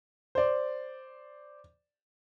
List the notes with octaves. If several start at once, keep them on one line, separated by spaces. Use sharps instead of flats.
C5 D5